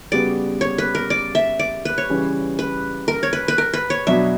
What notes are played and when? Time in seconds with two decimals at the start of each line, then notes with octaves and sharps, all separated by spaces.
0.12 C#3 G3 B3 F#4 D5
0.61 C#5
0.78 B4
0.95 A#4
1.10 D5
1.35 E5
1.59 D5
1.85 B4
1.98 C#5
2.09 C#3 E3 G3 C#4
2.59 B4
3.08 A#4
3.23 C#5
3.33 B4
3.48 B4
3.58 A#4
3.73 B4
3.90 C#5
4.07 B2 F#3 B3 D4 E5